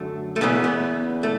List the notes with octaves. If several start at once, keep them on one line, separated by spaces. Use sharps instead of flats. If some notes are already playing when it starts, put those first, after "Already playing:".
Already playing: F#2 D3 A3
A3
E2 C#3 E3 B3
B3
A3